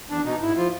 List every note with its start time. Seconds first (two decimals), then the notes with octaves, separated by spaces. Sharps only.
0.09 E2 D4
0.25 B2 D#4
0.42 G#2 E4
0.57 F3 F4